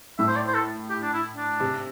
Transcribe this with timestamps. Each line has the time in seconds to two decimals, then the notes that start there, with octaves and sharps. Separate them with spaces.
0.19 A2 E5
0.28 C5
0.37 D5
0.47 C5
0.54 A4
0.90 G4
1.02 D4
1.14 E4
1.36 D4
1.60 C3